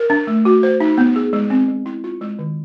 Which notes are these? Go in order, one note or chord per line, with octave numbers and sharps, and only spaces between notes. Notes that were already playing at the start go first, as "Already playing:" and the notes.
Already playing: A#4
D4
A3
F#4
C5
D#4
B3
G#4
G#3
C4
G#3
E4
F4
G#3
D#3